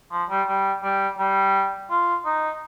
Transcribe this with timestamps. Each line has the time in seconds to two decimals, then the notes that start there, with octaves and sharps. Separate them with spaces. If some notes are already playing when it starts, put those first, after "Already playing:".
0.11 F3
0.29 G3
0.47 G3
0.83 G3
1.18 G3
1.90 F4
2.26 D#4